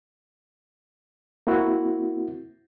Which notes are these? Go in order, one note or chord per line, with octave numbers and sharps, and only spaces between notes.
A#3 C4 E4 F#4